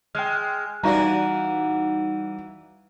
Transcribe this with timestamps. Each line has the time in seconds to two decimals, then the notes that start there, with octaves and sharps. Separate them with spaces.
0.15 G#3 G5 F6
0.83 E3 G3 D#4 F#4 D5 F5 A#5